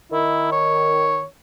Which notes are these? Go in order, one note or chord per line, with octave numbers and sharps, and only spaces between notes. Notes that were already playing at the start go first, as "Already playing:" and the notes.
D#3 E4
C#5